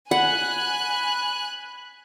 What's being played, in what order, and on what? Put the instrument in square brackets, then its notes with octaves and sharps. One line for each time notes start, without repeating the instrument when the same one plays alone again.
[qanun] F#5 [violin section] G#5 F#6 [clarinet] B5